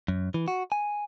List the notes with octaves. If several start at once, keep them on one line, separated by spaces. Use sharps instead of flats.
F#2
E3
F#4
G#5